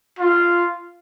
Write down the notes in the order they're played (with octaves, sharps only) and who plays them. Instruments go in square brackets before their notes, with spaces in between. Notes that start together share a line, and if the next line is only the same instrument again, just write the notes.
[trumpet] F4